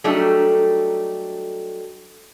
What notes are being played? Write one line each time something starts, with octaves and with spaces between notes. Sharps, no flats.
F#3 G3 A3 D4 D#4 A4